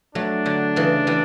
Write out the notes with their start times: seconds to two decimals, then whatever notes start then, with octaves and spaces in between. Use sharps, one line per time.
0.15 F#3 A3 D4
0.46 D3 F#3
0.76 C#3 E3
1.07 E3 G3